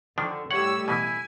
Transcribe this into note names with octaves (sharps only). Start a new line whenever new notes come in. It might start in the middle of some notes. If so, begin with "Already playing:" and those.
D3 D#3 F3 D4
A2 G3 C#5 F#5 E6
B2 E3 E4 G#5